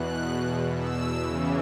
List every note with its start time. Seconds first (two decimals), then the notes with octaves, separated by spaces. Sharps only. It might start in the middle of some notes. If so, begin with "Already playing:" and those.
Already playing: E2 B2 F#6
0.34 E2 B2
0.78 E6
1.22 E2 C#3 E3